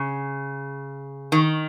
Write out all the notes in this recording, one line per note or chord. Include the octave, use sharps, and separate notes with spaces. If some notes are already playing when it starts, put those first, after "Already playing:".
Already playing: C#3
D#3